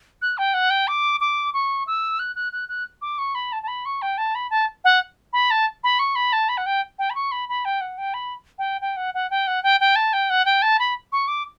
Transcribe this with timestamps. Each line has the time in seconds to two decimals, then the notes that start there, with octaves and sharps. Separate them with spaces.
0.22 F#6
0.38 G5
0.54 F#5
0.70 G5
0.88 D6
1.20 D6
1.54 C#6
1.87 E6
2.19 F#6
2.36 F#6
2.53 F#6
2.69 F#6
3.02 D6
3.18 C#6
3.35 B5
3.52 A5
3.63 A5
3.68 B5
3.85 C#6
4.02 G5
4.18 A5
4.35 B5
4.50 A5
4.85 F#5
5.33 B5
5.51 A5
5.84 B5
5.99 C#6
6.16 B5
6.33 A5
6.49 B5
6.57 F#5
6.66 G5
6.99 G5
7.10 B5
7.15 C#6
7.32 B5
7.49 B5
7.65 G5
7.81 F#5
7.98 G5
8.14 B5
8.58 G5
8.81 G5
8.97 F#5
9.14 F#5
9.30 G5
9.47 F#5
9.63 G5
9.80 G5
9.96 A5
10.13 G5
10.30 F#5
10.45 G5
10.62 A5
10.79 B5
11.12 C#6
11.28 D6